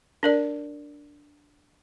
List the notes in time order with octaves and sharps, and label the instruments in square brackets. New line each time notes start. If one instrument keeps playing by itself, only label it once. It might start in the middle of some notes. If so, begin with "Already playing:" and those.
[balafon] D4 A#4 D5